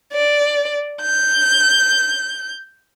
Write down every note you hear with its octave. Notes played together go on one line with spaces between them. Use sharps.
D5
G6